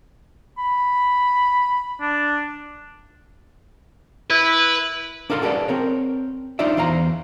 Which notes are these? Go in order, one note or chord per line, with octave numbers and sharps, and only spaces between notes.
B5
D4
E4 B4
D4 A4 A#4 F5 B5 C6
F#4 G#4 A4 B4 D5
C4 A#4 C#5
D4 D#4 F4 C5 D5 E5
E2 C5 F5 A#5